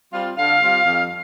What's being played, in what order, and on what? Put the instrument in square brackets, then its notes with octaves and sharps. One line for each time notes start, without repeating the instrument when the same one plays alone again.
[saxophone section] G3 C4 F4
D3 F5
G3 C4 F4
F2